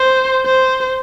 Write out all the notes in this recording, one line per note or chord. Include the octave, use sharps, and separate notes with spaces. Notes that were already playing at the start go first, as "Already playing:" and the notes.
Already playing: C5
C5